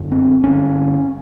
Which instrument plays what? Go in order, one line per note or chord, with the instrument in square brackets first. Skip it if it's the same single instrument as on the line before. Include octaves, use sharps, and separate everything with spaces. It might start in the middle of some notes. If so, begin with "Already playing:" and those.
Already playing: [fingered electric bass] G1 F#2 D3
C4
G1 G2 D3 C#4